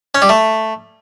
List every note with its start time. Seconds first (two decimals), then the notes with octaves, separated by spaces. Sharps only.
0.15 C#4
0.22 G3
0.29 A3